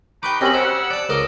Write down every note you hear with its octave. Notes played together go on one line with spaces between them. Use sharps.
D#4 G4 B4 G5 C#6 D6
F#2 C4 C#4 G4 D#5 B5
C#3 G3 C5 F#5 E6
D5 A5
C#2 C#3 C4 A#4 D#5 D6